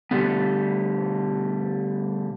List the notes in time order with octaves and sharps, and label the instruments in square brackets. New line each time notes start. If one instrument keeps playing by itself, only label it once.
[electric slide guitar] B2 D3 F3 G3 A3 B3